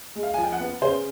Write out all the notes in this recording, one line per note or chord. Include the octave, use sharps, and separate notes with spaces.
G#3
F5
F3 G#5
G5
F#5
B3
C#3 C5